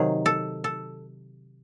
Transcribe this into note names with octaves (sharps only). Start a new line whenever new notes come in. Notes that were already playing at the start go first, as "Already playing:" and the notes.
Already playing: C3 D#3 F#3 G#4
A4
A4